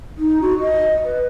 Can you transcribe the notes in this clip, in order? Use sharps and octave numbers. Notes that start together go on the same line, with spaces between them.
D#4
F#4
D#5
B4